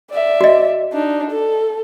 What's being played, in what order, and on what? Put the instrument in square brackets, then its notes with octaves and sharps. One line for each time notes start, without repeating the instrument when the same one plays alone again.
[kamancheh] D5 E5
[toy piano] F#4 D#5
[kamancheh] D4 D#4
A4